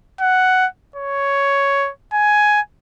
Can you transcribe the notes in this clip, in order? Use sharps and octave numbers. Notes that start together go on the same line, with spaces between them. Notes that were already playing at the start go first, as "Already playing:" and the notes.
F#5
C#5
G#5